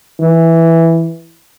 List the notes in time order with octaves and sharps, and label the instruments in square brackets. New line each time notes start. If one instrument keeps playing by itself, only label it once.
[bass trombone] E3